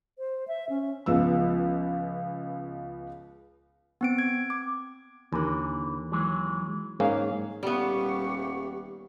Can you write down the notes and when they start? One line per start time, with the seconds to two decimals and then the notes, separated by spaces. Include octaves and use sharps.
0.19 C5
0.48 E5
0.69 C#4
1.06 C#2 F3 B3 E6
4.01 B3 C4 D7
4.18 G#6
4.50 D6
5.33 D#2 D3 E3 A#4
6.12 E3 F#3 G#3
7.00 G#2 A#3 C#4 G#4 F5
7.63 D#1 G3 B3 G4 E5 F#5 C#6